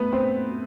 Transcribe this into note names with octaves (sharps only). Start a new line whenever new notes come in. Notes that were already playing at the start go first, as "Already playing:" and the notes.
Already playing: A3 B3 B4
C4 C5